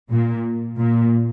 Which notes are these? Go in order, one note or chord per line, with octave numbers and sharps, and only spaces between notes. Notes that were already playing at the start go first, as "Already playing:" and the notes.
A#2
A#2